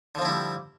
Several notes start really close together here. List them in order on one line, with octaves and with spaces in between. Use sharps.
D3 F3 C4 E4 G3